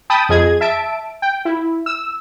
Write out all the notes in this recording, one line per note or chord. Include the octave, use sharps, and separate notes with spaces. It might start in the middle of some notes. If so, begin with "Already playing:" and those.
G5 A5 B5 D#6
F2 F3 G#4 D#5 G#6
E5 A5 D7
G5
E4
E6